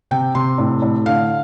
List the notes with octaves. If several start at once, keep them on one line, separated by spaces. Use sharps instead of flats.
C3 G5
C3 C6
A2
A2
D3 F5